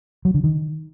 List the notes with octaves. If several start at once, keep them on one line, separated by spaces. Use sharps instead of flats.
F#3
D3
D#3